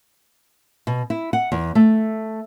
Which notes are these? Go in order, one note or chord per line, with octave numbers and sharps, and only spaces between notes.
B2
E4
F#5
E2
A3